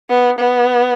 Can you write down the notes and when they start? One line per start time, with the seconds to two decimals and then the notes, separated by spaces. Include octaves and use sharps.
0.10 B3
0.39 B3